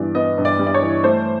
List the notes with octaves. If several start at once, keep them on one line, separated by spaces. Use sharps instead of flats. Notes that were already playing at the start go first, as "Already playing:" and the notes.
Already playing: G2 E3 G3 B3 D5
B3 D#5
G2
D5
G3
D5
C#5
E3
A3 C5